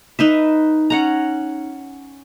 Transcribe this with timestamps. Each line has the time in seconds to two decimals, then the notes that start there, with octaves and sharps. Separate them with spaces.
0.19 D#4 B4 E5
0.90 C#4 F#5 A#5